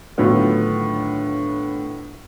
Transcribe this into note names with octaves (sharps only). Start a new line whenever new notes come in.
A2 D3 D#3 F#3 B3 F4